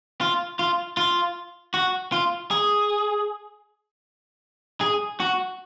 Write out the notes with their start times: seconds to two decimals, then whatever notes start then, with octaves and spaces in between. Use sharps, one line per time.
0.21 F4
0.59 F4
0.97 F4
1.74 F#4
2.12 F4
2.51 G#4
4.81 G#4
5.20 F#4